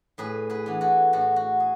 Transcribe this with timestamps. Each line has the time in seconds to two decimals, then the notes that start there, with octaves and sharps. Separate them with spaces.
0.18 A2 G#4 B4
0.50 G#4 B4
0.66 E3 B3 D4
0.81 F#4 A4
1.13 A2 F#4 A4
1.36 F#4
1.60 G#4